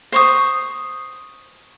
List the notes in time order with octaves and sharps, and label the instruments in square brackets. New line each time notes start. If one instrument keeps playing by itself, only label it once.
[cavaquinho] C5 C#6 D#6